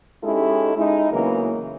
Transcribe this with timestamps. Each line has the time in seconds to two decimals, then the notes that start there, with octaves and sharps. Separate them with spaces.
0.23 G#3 C#4 D#4 E4 G4 A4
0.76 G#3 D#4 E4
1.11 C#3 E3 F#3 A#3 B3 A#4